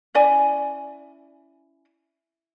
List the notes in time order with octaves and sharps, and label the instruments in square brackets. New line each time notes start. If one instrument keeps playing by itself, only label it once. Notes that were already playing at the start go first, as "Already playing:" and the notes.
[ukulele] C#4 E4 D5 G#5